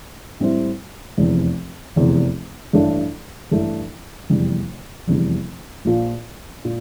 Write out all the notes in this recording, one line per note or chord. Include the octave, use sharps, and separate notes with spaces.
A2 G3 C4 E4
F1 E2 C3
F1 E2 C3
A1 G2 E3 A3 D4
A1 G2 E3 A3 D4
F1 E2 C3 G3
F1 E2 C3 G3
A#1 A#2 F3
A#2